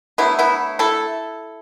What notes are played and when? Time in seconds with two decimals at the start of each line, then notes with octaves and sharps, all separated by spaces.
0.18 D3 F#3 A3 B3 E4
0.39 B3 E4
0.79 E4 A4